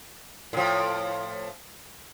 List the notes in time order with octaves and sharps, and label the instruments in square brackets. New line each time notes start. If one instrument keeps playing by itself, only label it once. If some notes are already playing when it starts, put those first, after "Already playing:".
[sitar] A2 F3